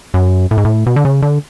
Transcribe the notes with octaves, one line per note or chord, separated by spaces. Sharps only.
F#2
A2
G#2
A2
B2
D3
C#3
D3